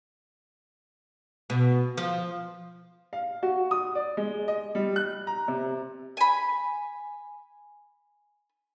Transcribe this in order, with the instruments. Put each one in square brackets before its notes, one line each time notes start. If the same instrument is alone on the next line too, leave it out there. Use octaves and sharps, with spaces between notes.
[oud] B2
F3
[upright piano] F5
F#4
D#6
D5
G#3
D#5
G3
F#6
A#5
C3
[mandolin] G#5 B5